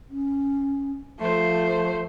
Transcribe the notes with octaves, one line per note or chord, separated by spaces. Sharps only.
C#4
F3 A3 C5